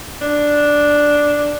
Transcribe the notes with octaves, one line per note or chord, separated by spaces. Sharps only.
D4